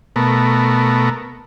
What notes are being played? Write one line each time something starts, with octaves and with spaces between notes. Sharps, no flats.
B2 A3 B3 A#4